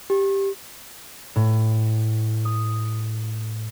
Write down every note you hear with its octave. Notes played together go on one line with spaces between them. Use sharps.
G4
A2
D#6